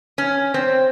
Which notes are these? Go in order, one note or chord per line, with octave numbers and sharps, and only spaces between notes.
C#4
C4